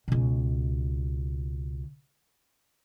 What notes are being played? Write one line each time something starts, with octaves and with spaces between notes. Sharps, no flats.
C#2 B2